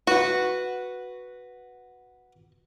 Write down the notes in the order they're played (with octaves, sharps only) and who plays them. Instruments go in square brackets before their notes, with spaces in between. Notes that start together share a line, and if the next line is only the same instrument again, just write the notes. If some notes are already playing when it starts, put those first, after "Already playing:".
[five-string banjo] F#4 [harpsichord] B4 F#5